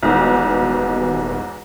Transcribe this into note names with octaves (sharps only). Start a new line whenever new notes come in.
D#1 B1 E2 G#2 B2